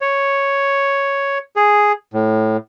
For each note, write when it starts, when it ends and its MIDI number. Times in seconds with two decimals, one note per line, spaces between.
0.01 1.38 73
1.56 1.92 68
2.13 2.57 45